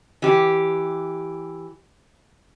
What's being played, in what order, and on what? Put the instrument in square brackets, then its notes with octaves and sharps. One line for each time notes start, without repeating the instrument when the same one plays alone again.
[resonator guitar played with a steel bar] E3 G4